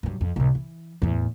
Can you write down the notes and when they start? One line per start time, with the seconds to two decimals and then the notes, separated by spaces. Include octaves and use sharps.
0.03 G2 F#3
0.21 F2
0.36 C2 A2
0.55 E3
1.02 E2 A2